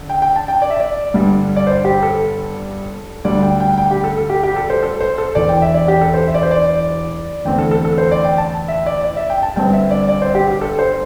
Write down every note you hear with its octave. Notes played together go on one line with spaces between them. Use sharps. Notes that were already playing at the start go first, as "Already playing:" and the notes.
Already playing: D3
G5
G5
A5
G5
D5
E5
D5
G1 G2 D3 G3
D5
C5
G4
A4
D2 D3 G3 D5
G5
G5
G5
G4
A4
A4
G4
G4
A4
C5
A4
C5
A4
E1 E2 E3 D5
G5
E5
D5
G4
A4
C5
E5
D5
C5
D5
E2 D3 A3 C4 G5
A4
A4
A4
C5
D5
G5
A5
E5
D5
D5
E5
G5
A5
G1 G2 D3 C4 G5
E5
D5
D5
C5
G4
G4
A4
C5